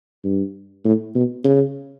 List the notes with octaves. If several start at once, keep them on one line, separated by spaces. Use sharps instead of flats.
G2
A2
B2
C#3